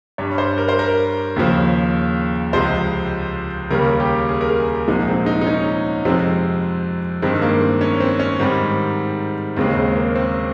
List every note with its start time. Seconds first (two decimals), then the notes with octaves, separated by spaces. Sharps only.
0.18 G2 G3 C#5
0.38 C5
0.58 A#4
0.68 C5
0.79 A#4
1.36 D#2 C#3 F3
2.53 C#2 C3 F3 G#3 C5
3.71 D#2 C#3 G3 A#4
4.00 G4
4.29 G#4
4.41 A#4
4.49 G#4
4.68 G#4
4.88 C2 A#2 F3 G#3 D#4
5.07 C4
5.26 D#4
5.41 D#4
5.47 C#4
6.05 F2 C3 F3 G#3 C4
7.22 G2 D#3 G#3 C4
7.42 A#3
7.61 C4
7.81 C#4
8.01 C4
8.20 C#4
8.40 G#2 D#3 G3 C4
9.56 D#2 C#3 G#3 C4
9.76 C4
9.96 A#3
10.16 C4